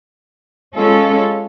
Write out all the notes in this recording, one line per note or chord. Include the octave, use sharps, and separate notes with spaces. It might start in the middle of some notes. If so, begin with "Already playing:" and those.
G#3 C#4 F4 A4